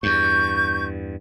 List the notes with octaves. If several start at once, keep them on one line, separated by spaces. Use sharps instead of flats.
E2 G2 C#6 G6